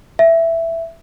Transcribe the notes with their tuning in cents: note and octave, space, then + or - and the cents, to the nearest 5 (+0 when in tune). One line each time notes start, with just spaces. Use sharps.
E5 +5